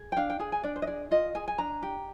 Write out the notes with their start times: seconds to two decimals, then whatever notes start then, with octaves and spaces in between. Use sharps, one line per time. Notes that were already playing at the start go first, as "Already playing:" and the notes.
Already playing: G#4
0.12 G5
0.17 D4 F5
0.30 G5
0.39 G#4 G#5
0.52 G#5
0.63 D4 D5
0.76 C5
0.82 D#5
0.87 G#4 D5
1.11 F4 D#5
1.35 G#4 G#5
1.48 G#5
1.58 D4 A#5
1.83 G4